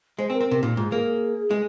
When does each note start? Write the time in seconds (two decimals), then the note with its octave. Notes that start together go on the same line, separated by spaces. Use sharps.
0.19 G#3 C5
0.30 C4
0.34 A#4
0.41 C4
0.48 C3 A#4
0.63 A#2 D#4
0.77 G#2 F4
0.92 A#3 G#4
1.51 G#3